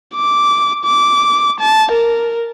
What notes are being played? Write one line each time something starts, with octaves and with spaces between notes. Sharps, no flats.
D6
D6
A5
A#4